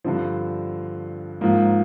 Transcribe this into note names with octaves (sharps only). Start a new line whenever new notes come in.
G2 D3 F3 C4
G#2 F3 A#3